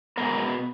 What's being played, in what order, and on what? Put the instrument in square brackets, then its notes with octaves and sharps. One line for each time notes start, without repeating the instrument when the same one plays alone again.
[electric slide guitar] B2 G#3 B3 A#4